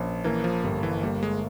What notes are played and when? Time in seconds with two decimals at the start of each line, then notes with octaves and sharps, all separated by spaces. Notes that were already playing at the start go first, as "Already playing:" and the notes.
Already playing: A#1 C#4
0.24 E3 A#3
0.44 F3
0.63 G1 G3
0.83 E3
1.03 G3 A#3
1.23 G#3